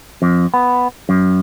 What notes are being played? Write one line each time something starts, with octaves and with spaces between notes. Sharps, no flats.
F2
B3
F#2